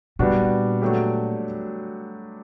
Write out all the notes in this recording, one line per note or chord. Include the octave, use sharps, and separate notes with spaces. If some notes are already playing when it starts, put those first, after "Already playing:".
A#2 G3 B3 D4 F#4
F#3 A3 D4 G4